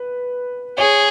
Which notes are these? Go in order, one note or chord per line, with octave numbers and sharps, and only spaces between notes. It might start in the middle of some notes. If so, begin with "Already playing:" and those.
Already playing: B4
G#4 C#5